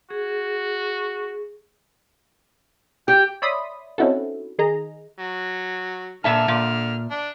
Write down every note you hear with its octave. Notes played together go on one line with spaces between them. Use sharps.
F#4 G#4
G4 G5
C#5 D5 E5 B5 C6 D#6
C4 C#4 D#4 E4 F#4 A4
D#3 G#4 D#5 A#5
F#3
A#2 D3 E5 A5 F6
A#2
D4